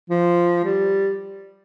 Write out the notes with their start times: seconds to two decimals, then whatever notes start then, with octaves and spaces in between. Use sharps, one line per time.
0.10 F3
0.64 G3